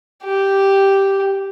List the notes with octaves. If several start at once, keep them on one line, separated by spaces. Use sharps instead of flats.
G4